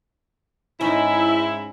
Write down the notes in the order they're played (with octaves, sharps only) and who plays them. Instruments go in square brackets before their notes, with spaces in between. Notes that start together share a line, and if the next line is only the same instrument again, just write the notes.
[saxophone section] G#2 E4 [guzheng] C#4 D#4